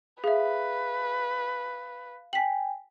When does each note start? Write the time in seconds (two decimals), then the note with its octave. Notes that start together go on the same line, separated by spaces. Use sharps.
0.24 G#4 B4 E5 F5
2.33 G5 G#5 B6 F#7